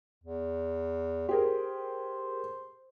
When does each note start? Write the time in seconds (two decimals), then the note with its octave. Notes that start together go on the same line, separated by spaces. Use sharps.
0.24 E2
1.29 G4 G#4 A#4 C5